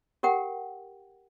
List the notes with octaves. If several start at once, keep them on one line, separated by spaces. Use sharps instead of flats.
G4 A#4 F#5 G5